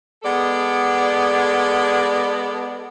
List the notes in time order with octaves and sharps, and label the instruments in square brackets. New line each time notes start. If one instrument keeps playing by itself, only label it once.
[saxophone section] G#3 B3 A4 D5